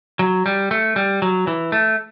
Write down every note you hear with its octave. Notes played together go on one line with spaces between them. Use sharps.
F#3
G3
A3
G3
F#3
E3
A3